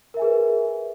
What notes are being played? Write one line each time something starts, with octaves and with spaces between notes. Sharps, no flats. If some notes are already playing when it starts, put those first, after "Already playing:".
G#4 A#4 B4 E5 G#5